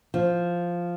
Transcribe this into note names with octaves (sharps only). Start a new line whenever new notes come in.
F3